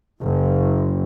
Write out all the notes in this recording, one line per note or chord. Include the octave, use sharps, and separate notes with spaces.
F#1